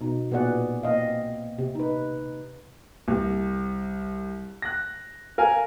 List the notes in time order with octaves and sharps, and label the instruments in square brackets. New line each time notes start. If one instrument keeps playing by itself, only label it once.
[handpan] B2 D#4
A#2 B3 F#4 G#4 D5 F#5
A#3 C4 D#5 F5
C3
D#4 B4
[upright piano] C2
F#6 A#6
A#4 F5 G#5